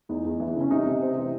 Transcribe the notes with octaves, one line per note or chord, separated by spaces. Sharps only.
E2 D#4
E2
E3
C#3
C#4
C3 D#4
C3
C4
E3